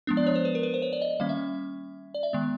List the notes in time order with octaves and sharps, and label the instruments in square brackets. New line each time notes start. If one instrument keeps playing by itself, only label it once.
[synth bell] F3 G#3 B3 D4
D5
C#5
C5
B4
A#4
B4
C5
C#5
D5
D#5
D#3 G3 A#3 C#4 F5
E5
D5
E5
D#3 G#3 B3